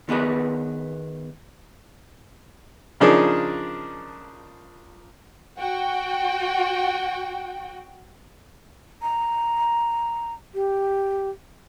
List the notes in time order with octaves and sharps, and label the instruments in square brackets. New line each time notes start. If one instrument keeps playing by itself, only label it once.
[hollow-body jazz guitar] D#3 B3 G#4 B4
[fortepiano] C#3 F3 D4 D#4 G#4 A#4
[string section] F#4 G5
[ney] A#5
G4